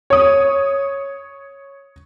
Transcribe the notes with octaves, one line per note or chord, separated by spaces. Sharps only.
C#5 D#6